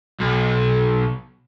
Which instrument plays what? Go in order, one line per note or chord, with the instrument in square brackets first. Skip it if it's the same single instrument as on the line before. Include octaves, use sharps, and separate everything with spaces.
[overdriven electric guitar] B1